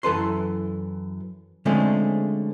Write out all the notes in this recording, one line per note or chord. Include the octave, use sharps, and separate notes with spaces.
F#2 E3 A4 B4 C6
D3 F3 G#3 A3 C4 C#4